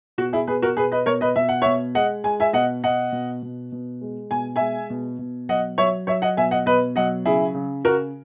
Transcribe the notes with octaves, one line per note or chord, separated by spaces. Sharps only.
B2 F#4
E4 G#4
B2 G#4 B4
F#4 A#4
B2 G#4 B4
B4 D#5
B2 A#4 C#5
B4 D#5
B2 E5
F#5
B2 C#5 E5
G#3 D#5 F#5
G#3 G#5
E5 G#5
B2 D#5 F#5
B2 D#5 F#5
B2
B2
B2
G#3
B2 G#5
G#3 E5 G#5
B2
B2
F#3 D#5 F#5
F#3 C#5 E5
F#3 C#5 E5
D#5 F#5
B2 E5 G#5
D#5 F#5
B2 B4 D#5
F#3 D#5 F#5
C#3 E4 G#4
C#3
C#3 F#4 A#4